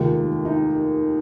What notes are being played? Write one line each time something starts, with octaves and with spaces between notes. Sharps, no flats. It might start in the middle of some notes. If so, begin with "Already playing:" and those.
Already playing: F1 D#2 D#3 G#3 F4
D#4